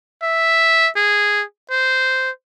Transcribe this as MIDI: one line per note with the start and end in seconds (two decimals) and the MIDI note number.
0.23 0.89 76
0.96 1.44 68
1.71 2.30 72